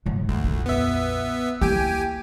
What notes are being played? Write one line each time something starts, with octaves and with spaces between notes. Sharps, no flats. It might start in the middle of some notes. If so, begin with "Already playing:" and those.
G#2 F#3
D2 D#3
A#1 F2
B3 E5
A#3 E4 G4 G5 G#5